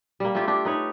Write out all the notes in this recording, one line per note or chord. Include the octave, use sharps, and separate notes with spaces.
G3 A#3
A3 E4 F4 G4
D4 G4
D#4 B4 C#5